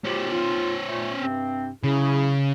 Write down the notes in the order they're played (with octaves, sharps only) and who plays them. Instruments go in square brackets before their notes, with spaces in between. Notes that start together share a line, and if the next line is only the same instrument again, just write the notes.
[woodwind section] B2 F4 G4 [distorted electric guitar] C#4 C5
[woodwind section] F4
A#2 A3
G2 C3 C4
[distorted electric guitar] C#3 [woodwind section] F#3 E4 G#4